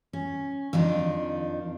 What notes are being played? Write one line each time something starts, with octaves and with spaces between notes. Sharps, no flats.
C#4
F2 D#3 F3 D4 D#4